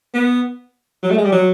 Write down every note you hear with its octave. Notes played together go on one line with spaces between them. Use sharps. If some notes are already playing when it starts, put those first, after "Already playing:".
B3
F#3
A3
G#3
G3
F#3